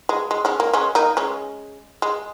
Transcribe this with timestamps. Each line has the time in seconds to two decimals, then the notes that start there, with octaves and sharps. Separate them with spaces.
0.09 G#3
0.31 G#3
0.45 G#3 C#4
0.60 A#3
0.73 G#3 C#4
0.95 A#3 D#4
1.17 G#3 C#4
2.02 G#3